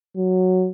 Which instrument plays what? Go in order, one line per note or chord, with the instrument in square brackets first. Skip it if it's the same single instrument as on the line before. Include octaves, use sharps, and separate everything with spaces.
[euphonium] F#3